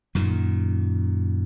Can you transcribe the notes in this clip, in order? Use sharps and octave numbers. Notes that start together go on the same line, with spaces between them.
F#2 A#2 D#3